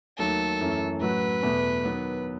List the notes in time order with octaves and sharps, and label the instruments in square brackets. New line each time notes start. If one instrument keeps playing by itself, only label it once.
[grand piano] D#2 D#3 F#3 A3 [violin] A4
[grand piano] F#2 E3 A3 C#4
[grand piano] A2 F#3 C#4 F#4 [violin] B4
[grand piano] E2 B2 A3
D#3 F#3 B3